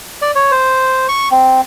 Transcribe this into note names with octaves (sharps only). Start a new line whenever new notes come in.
D5
C#5
C5
C#6
C4